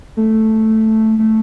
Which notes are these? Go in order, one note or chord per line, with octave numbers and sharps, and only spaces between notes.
A3
A3